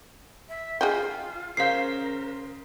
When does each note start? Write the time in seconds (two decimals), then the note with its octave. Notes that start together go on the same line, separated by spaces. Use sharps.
0.49 E5
0.81 F4 G#4 D#5 G5
1.57 C#3 A#4 C5 F5 G6 C7